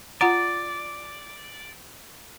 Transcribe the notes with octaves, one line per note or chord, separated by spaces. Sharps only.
F4 D5 F#5 A#5